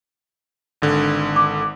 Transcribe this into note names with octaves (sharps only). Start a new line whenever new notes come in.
G#1 D3
D6